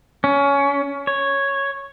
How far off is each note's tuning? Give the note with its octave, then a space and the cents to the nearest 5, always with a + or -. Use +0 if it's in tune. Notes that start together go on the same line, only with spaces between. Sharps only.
C#4 +20
C#5 -5